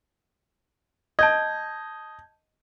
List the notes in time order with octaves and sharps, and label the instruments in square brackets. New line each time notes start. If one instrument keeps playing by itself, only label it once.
[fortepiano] D#5 [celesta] A5 G6 G#6